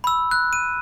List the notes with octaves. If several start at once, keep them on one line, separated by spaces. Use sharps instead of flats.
B5 E6
F#6
D#7